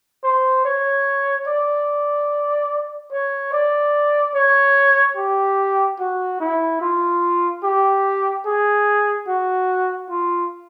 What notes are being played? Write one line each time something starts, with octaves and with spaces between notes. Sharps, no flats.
C5
C#5
D5
C#5
D5
C#5
G4
F#4
E4
F4
G4
G#4
F#4
F4